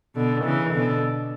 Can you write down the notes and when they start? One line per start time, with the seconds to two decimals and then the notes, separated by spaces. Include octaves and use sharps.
0.15 B2 D3
0.44 C#3 E3
0.74 B2 D3